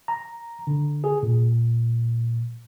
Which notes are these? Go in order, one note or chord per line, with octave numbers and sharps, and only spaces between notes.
A#5
D3
G#4
A#2